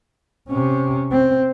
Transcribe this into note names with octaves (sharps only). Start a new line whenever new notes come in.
C3 C#4
C4